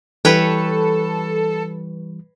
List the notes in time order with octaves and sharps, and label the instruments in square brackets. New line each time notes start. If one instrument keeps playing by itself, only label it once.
[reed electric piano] E3 G3 [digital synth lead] A4 [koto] B4 C#5 G5